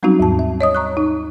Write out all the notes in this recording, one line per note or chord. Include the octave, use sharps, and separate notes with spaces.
F#3 G3 C4 C#4 D#4 F#4
D#2 G#2 A5
E5
C#5 D#5 D#6
A#5 C#6 F#6
D#4